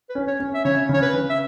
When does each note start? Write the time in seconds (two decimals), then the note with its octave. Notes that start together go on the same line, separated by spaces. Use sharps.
0.09 B4
0.15 C#4
0.28 C#5
0.40 C#4
0.54 E5
0.65 C#3 C#5
0.89 C#3 C#5
1.02 B4
1.14 C#3
1.30 E5